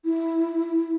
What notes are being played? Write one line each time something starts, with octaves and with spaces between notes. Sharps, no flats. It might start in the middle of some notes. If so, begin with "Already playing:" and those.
E4